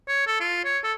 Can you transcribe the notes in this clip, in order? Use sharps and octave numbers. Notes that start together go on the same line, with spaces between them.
C#5
A4
F4
C#5
A4